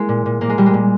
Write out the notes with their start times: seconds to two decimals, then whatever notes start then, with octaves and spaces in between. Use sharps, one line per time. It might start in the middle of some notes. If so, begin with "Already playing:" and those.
Already playing: G#3 A#3 E4
0.09 A#2
0.26 A#2
0.41 A#2 A#3
0.50 G#3
0.58 A#2 G3
0.66 G#3
0.74 A#2